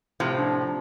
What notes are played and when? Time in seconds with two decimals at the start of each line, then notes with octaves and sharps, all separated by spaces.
0.20 A2 C3 F3
0.39 D4